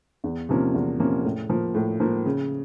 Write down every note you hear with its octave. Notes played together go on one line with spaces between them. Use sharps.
E2
C3 F3 A#3 C#4
E2
C3 F3 A#3 C#4
A2
F3 A#3
A2
F3 A#3
C#3